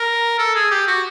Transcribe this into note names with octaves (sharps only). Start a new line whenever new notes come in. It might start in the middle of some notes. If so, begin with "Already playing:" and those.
Already playing: A#4
A4
G#4
G4
F#4